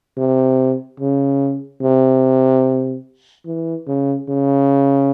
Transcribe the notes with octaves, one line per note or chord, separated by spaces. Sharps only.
C3
C#3
C3
E3
C#3
C#3